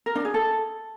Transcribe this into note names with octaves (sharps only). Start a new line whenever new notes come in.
A#4
D4
G#4
A4